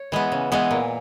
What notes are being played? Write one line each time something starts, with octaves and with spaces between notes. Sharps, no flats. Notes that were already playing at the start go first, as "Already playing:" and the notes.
Already playing: C#5
E3 G#3 B3
C#3
E3 G#3 B3
A#2